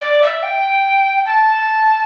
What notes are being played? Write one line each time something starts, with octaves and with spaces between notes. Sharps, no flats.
D5
E5
G5
A5